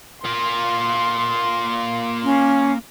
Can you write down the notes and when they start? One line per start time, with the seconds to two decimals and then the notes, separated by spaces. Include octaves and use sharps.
0.25 A#3 F4 C6
2.23 C#4